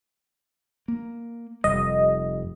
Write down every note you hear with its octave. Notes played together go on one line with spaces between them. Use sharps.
A#3
F1 G3 D#5